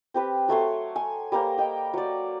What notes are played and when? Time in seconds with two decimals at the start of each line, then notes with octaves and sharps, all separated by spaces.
0.14 C4 G4 B4
0.48 F#3 A3 C#5 C6
0.96 G#5
1.32 G3 A#3 A#4 C5
1.58 D#5 G5
1.93 F#3 D5